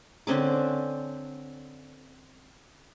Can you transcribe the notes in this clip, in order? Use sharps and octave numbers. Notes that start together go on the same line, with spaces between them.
D3 C4 C#4 D6